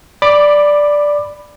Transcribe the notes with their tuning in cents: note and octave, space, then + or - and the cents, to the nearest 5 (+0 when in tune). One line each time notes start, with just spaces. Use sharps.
D5 +0 B5 +0 D6 +15